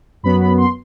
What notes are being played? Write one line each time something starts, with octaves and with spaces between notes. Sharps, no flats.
F#2 F#3 B3 B5
B5
C6